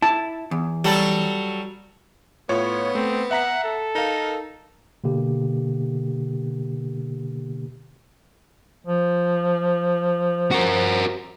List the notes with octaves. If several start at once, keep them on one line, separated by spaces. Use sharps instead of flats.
E4 A5
E2
F#3 G3 A4
A2 B3 F4 C#5
A3 C4
E5 F#5 A#5 B6
A4
D#4 A#4 F5
B2 D3 A#3 G4
F3
F#4 A#4